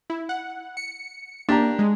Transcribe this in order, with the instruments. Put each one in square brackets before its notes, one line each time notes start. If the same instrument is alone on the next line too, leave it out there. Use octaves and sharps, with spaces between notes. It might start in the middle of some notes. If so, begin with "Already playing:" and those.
[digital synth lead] E4
F#5
C#7
[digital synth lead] A#3 [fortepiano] D4 G4 A#5
[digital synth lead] G#3